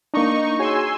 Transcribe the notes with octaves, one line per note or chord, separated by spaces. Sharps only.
A#3 D4 D#4 C#6
F#4 G#4 C#5 G#5 C6 E6